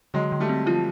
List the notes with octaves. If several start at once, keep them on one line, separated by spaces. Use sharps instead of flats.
D3 F#3 G#3
D3
G3 A3
C4
F3 F4